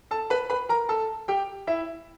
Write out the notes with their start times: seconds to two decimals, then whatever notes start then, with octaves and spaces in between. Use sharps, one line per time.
0.11 A4 A5
0.30 B4 B5
0.50 B4 B5
0.69 A#4 A#5
0.89 A4 A5
1.28 G4 G5
1.67 E4 E5